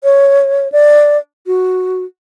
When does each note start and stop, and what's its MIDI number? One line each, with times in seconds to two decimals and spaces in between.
0.04 0.71 73
0.72 1.18 74
1.47 2.03 66